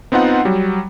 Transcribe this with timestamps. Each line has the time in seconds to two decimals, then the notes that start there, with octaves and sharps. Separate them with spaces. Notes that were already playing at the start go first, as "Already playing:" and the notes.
0.12 B3 C4 D#4 F4 F#5
0.45 F#3 G3